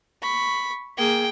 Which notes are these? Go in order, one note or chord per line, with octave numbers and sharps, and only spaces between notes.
B5 C#6
A#3 G#4 G5